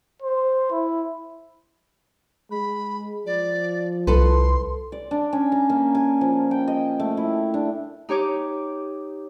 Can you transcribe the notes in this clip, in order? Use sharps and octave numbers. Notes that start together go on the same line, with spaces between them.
C5
E4
G#3 B5
F3 D5
C2 A4 B4 C6
D5
D4
C#4
A#5
A#3
G#5
F3
G5
D#5
A3
E4
D4
D#4 G4 C#5 D6